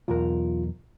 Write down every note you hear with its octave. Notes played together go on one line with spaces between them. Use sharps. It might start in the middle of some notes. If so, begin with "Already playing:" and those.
B1 E2 F4 A#4